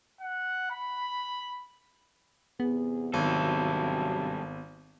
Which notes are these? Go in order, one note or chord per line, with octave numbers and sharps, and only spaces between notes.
F#5
B5
E2 C3 B3 G#4
G#1 G2 C3 F#3 A4